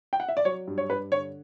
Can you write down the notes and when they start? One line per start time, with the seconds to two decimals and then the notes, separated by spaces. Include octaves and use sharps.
0.13 G5
0.20 F#5
0.28 E5
0.37 D5
0.45 F#3 C#5
0.67 G2
0.78 C#5
0.90 G2 B4
1.12 D3 C#5